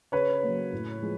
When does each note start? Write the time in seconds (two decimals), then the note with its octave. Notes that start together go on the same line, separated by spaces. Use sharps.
0.12 C#3 B4 C#5
0.43 F#3 A#3
0.73 A2
1.02 F3 G#3